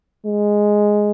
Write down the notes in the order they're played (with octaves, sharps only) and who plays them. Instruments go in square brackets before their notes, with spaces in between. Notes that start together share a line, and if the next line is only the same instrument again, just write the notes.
[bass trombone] G#3